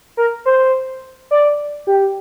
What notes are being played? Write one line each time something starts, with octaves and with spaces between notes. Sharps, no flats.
A#4
C5
D5
G4